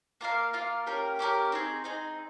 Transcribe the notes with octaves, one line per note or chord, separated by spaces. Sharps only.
A#3 F4 A#4 F5
A#3 F4 A#4 F5
A#3 C#4 G4 A#4
A#3 C#4 G4 A#4
C4 D#4 G#4
C4 D#4 G#4